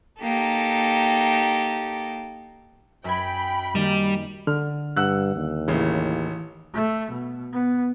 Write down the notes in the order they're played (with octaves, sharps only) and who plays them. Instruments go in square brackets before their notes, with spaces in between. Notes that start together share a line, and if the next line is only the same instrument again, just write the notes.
[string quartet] A#3 D#4 G4 A4
[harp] F#2 G#6 [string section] G5 B5
[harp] D#3 A#3 D#7 [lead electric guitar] G3
[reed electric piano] D3 [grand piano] F6
[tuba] G2 [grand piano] F#5 E6 F#6
[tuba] D#2
[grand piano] A1 C#3 [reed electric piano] E3
[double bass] A3
B2
B3